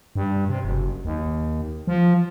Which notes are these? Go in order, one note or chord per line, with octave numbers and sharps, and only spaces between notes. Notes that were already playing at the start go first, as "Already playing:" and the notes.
G2
C3
F#1
D#2
F3